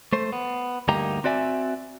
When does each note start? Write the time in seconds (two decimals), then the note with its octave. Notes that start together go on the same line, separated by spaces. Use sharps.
0.13 A3 C5
0.33 B3
0.88 D2 G2 A#3 D#4 G4 A#5
1.24 C4 F#4 D5 E5 G#5